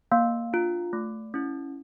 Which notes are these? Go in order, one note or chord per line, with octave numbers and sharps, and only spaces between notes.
A#3 F5
D4 F4
A3
C#4 E4